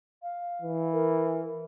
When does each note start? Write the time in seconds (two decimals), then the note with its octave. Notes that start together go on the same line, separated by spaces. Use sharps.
0.22 F5
0.62 E3
0.92 A#4